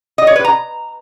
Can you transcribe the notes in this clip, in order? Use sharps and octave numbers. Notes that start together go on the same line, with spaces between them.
D#5
C#5
B4
A#5